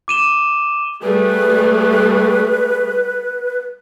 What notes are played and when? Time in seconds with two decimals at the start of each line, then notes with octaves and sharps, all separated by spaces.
0.08 D6 D#7 E7 G7
1.03 G3 A3 G#4 B4